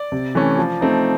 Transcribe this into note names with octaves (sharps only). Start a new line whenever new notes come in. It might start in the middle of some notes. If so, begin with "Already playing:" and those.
Already playing: D5
C3
E3 A3 C#4
F3
A3 C4 D#4